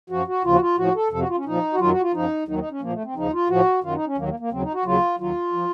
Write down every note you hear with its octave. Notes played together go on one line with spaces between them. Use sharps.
F#2 F3 F#4
F#4
D#2 C#3 F3 F4
F#4
F4
A2 F3 F#4
A4
F2 C3 F3 A4
F#4
F4
C#4
A#2 F3 D#4
F#4
F#2 D#3 F#3 F4
F#4
F4
F#2 F3 D#4
D#2 D#3 F#3 D#4
D#4
C#4
A#2 F3 A#3
A3
C4
D#2 C#3 F3 D#4
F4
A2 F3 F#4
F#2 D#3 F#3 F4
D#4
C#4
D#2 D#3 F#3 A#3
A#3
A#3
D#2 C#3 F#3 C4
D#4
F#4
D#2 C#3 F#3 F4
D#2 D#3 F#3 F4
F3